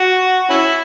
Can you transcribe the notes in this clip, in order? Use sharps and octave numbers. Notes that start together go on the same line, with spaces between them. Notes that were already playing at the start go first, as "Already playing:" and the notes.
Already playing: F#4
C#4 E4